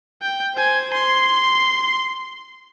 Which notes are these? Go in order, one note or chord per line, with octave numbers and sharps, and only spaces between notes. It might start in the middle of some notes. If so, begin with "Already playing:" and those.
G5
C5 G#5
C6